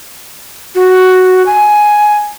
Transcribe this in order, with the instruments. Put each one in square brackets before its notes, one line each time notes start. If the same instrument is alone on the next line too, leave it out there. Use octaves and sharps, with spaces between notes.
[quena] F#4
G#5